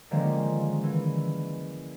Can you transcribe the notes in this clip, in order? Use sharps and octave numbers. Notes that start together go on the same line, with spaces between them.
D3 D#3 F3 G#3 A#3 C#4
E3